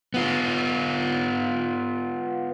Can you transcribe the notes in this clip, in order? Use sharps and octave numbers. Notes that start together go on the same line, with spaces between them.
B3 F4